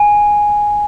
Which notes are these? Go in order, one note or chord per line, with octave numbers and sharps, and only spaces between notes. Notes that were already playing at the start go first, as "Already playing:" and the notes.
Already playing: G#5